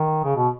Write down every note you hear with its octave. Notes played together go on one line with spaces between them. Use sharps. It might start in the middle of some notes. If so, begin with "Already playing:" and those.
Already playing: D#3
C#3
B2